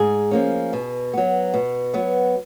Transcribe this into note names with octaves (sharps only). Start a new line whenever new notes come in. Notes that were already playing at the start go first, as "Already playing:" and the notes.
Already playing: G#2 G#4 G#5
F3 A#3 C#4
B2
F#3 B3
B2
F#3 B3